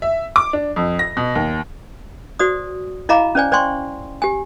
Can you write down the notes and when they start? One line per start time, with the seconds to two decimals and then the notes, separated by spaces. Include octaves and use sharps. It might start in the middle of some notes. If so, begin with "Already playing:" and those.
0.02 E5
0.36 D6
0.53 D4
0.76 F2
0.99 A#6
1.17 B2
1.35 D#2
2.39 F#4 C5 D5 D#6
3.09 E4 D#5 F5 A#5 B5 D6
3.35 C#4 C5 D5 G#5
3.52 C5 D5 G5 G#5 C6 C#6
4.22 G4 G#5